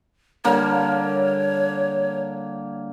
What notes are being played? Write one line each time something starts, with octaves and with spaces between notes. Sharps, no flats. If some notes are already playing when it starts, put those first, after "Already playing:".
D3 G3 A#3 C#5